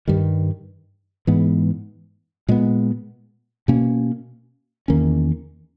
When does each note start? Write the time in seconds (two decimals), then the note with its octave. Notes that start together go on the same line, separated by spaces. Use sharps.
0.08 G2 D#3 G3
1.27 G#2 E3 G#3 B3
2.48 A#2 G#3 B3
3.68 B2 A#3 C#4
4.88 E2 D#3 A#3 C#4